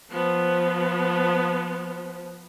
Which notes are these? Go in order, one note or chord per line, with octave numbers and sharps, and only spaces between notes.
F3 B3